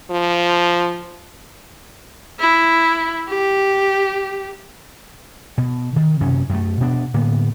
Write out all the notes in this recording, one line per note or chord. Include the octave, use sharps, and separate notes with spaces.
F3
E4
G4
B2
D#3
F#2 C3 C#4
F#2 A3
B2 B3 D4
A2 D3 A#3 B3